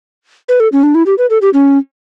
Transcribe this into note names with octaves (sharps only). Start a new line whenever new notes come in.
B4
A4
C#4
D4
E4
G4
B4
A4
G4
C#4